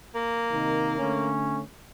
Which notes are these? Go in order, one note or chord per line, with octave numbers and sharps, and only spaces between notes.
A#3
C3 D#3 D#4
D3 A3 C#4